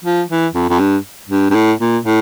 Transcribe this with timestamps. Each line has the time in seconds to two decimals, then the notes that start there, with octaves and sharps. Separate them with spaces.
0.04 F3
0.30 E3
0.54 F2
0.69 F2
0.79 G2
1.29 G2
1.50 G2
1.55 A2
1.80 A#2
2.05 A2